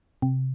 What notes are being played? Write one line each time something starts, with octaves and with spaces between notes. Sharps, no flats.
C3